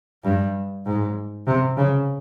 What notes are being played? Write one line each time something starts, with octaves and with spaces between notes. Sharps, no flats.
G2
G#2
C3
C#3